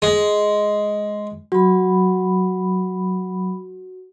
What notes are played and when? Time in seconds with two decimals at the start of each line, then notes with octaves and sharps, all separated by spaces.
0.02 G#3
1.52 F#3 F#4 B5